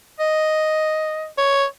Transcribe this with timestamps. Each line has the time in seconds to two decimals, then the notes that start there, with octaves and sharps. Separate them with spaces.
0.20 D#5
1.38 C#5